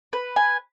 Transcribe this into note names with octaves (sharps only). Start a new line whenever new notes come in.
B4
G#5